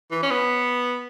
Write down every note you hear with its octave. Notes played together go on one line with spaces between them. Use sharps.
E3
C#4
B3